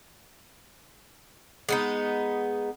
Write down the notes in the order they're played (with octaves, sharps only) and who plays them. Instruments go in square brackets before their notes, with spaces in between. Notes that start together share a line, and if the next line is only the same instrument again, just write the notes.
[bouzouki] G#3 B3 D#4